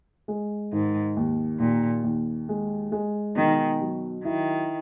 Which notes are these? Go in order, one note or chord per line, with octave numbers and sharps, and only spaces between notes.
G#3
G#2 D#3
D#2
D#2 A#2
D#2
G#3
G#3
B2 D#3
F#3
D#3 E4